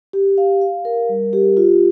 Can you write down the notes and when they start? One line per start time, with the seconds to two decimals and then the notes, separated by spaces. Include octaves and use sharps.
0.13 G4
0.38 F5
0.61 F5
0.85 A#4
1.09 G3
1.33 G4
1.57 F4